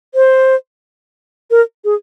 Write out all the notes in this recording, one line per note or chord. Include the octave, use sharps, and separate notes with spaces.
C5
A#4
G#4